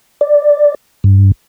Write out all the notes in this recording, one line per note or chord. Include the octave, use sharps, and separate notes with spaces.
D5
G2